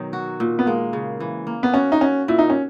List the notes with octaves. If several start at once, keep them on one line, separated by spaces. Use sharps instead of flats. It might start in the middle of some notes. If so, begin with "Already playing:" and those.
Already playing: B2 D#3 F#3 D#4
F#4
A#2
B3
G#3 A#3
C#3
E3
A#3
B3
C#4 F#4
D#4
C#4 F#4
A#2 E4
D#4
C#4